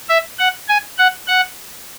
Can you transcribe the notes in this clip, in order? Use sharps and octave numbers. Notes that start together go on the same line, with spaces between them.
E5
F#5
G#5
F#5
F#5